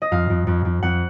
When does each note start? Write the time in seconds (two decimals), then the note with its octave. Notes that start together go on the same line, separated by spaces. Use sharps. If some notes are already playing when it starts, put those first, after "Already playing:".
0.02 D#5
0.11 F2 F5
0.30 F2
0.47 F2
0.65 F2
0.83 F2 F#5